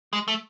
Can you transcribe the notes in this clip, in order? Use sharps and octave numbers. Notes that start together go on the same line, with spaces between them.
G#3
A3